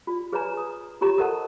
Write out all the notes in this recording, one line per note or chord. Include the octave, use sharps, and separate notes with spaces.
F4 D5
G#4 B4 C#5 D5 G#5 A#5
D#6
F4 G4 C#5 A#5 C#6
A4 A#4 C5 D#5 F#5 A5